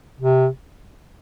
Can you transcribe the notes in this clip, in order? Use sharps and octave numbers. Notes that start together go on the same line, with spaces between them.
C3